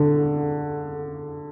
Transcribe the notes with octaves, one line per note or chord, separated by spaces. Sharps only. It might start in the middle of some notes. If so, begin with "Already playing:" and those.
Already playing: D3